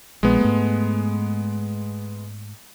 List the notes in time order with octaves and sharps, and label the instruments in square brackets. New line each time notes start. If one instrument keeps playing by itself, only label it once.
[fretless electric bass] A#1 [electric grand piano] G#3 B3
[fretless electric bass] G#2 A3